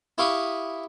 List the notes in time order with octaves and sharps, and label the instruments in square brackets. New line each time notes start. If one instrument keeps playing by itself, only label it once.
[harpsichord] E4 G4 F5 B5 C#6 D#6